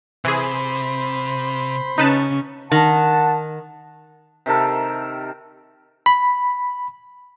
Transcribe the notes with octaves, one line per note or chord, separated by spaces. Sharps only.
C3 E3 G#4 C5 B5
C#3 C#4 D#4 B4 A5
D#3 F#5 A5
C3 D#3 A4 A#4
B5